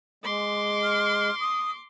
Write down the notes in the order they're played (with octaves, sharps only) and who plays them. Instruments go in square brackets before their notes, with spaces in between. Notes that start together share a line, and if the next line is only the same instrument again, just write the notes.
[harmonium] G#3 [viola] C6 D6
[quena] F6
D#6